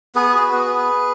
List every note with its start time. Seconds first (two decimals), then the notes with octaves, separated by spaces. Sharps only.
0.15 B3 G#4 B4
0.34 F#4
0.52 B3